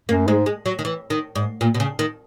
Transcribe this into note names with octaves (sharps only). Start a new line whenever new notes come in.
F#2 A#3
G#2 G#3
G#3
F#3
D#3
E3
D#3
G#2
A#2
B2
C#3
D#3